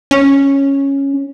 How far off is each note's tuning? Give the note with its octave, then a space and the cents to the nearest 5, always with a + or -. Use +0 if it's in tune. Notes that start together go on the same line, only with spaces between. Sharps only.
C#4 -5